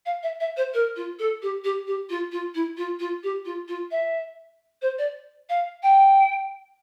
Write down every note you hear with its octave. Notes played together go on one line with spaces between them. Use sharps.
F5
E5
E5
C5
A#4
F4
A4
G4
G4
G4
F4
F4
E4
F4
F4
G4
F4
F4
E5
C5
D5
F5
G5